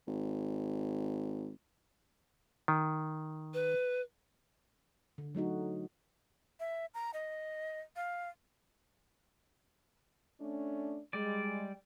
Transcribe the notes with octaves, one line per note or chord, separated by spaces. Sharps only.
G#1
D#3
B4
D3
F#3 A3 D#4 F#4
E5
A#5
D#5
F5
A3 C#4 D4
G3 G#3 D5